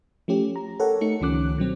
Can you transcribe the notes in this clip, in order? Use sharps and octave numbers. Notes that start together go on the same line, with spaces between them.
F3 A3 C#4 G4
A#5
G4 A4 A#4 C#5 F#5
A3 D#4 C#7
C#2 D#3 F3 C#4 D6 F#6
B2 F#3 C4